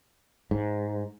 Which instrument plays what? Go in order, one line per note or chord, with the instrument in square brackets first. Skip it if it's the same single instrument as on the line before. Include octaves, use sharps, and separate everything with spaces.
[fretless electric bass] G#2